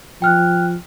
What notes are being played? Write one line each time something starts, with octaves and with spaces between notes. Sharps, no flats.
F3 G5 F6 F#6